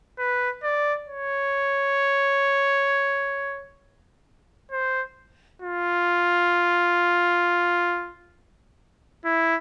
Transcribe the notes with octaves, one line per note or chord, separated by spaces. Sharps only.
B4
D5
C#5
C5
F4
E4